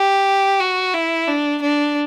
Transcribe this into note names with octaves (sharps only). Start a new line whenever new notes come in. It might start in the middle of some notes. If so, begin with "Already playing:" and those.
Already playing: G4
F#4
E4
D4
D4